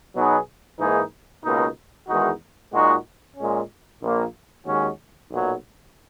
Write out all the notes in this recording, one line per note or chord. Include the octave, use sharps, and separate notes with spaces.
B2 F#3 B3 D#4 G#4
G#2 E3 A#3 D#4 G#4
C#2 B2 A#3 D#4
E2 D#3 G#3 D#4 F#4
A#2 G#3 D#4 F#4
A#2 G#3 C#4
A#1 A#2 A#3
D#2 D#3 G#3 C#4 F#4
B1 A#2 F#3